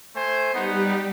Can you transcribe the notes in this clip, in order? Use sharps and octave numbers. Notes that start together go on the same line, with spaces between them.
A3 C5 G#5
G3 B3 D#4 G4 F#5